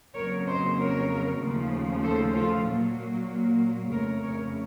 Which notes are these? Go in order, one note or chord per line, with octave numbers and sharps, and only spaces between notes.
F2 C#3 F#3 A#3 A#4 C#5
C5 D#5
A#4 C#5
D#2 C#3 F3 A3
A4 C5
F4 A4
A#2 F#3 A#3
F2 C#3 A3 A#4 C#5
A#4 C#5